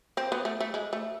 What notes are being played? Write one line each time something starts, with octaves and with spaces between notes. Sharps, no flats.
C4
B3
A3
A3
G#3
A3